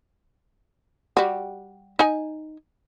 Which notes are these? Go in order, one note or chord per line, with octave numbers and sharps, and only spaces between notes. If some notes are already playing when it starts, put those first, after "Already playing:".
G3 F#4
D#4 G#5